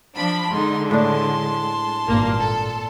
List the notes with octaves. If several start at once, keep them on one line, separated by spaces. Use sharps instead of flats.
F3 D4 B5
D3 G#3 D#4 C6
A2 D4 A5 C6
G#1 G2 A#2 A#3
A4